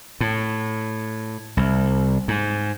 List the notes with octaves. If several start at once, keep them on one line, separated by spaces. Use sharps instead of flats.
A2
C2
G#2